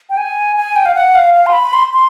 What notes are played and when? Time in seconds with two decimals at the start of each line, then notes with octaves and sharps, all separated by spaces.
0.10 G5
0.17 G#5
0.56 G#5
0.76 G5
0.86 F5
0.95 F#5
1.15 F5
1.34 F5
1.46 C6
1.53 B5
1.73 C6
1.94 C6